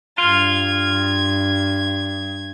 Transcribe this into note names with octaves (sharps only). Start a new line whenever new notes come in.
G2 F4 G#6